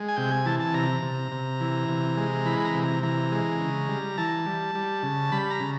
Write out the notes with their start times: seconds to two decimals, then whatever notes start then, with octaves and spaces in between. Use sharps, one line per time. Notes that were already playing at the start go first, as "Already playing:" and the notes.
Already playing: G#3
0.08 G#5
0.17 C3 G5
0.31 G#5
0.46 E3 A5
0.60 A5
0.74 C3 A#5
1.02 C3
1.32 C3
1.60 E3
1.88 C3
2.17 G#3
2.46 E3 B5
2.65 A#5
2.74 C3
2.83 A#5
3.03 E3 A#5
3.32 G#3
3.60 C#3
3.89 G3
4.18 E3 A5
4.46 G3
4.75 G3
5.03 C#3
5.32 G3 B5
5.50 A#5
5.60 C#3